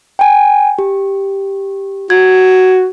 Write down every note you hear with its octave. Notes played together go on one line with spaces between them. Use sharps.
G5 G#5
G4
F#4 G#6